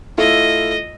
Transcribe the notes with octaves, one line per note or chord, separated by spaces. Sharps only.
A3 E4 F4 D#5